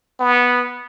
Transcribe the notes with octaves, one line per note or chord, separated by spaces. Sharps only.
B3